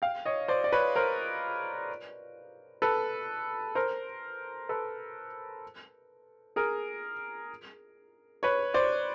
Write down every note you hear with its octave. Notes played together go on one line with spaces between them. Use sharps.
F5 G5
C#5 D#5
C5 D5
D5
B4 C#5
A#4 C5
A4 B4
A#4 C5
A4 B4
G#4 A#4
B4 C#5
C5 D5